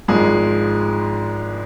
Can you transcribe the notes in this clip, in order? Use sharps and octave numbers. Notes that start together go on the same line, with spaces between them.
G#1 G#2 F3 G#3 G#4